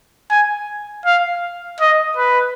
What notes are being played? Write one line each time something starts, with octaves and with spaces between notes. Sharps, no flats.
G#5
F5
D#5
B4